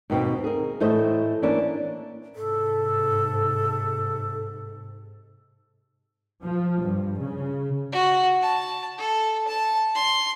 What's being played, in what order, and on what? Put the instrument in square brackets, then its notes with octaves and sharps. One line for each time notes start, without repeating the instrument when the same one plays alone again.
[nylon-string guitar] D#2 B2 C4
G#4 A#4
A2 E3 A3 C5 C#5 D#5
E3 A#3 C#4 D4
[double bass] G#2 C3 [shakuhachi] A4
[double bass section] F3
G2
C#3
[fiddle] F#4
A5
A4
A5
C6